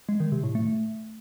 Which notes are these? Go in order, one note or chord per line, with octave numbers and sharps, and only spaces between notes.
G#3
D#3
C3
A2
A3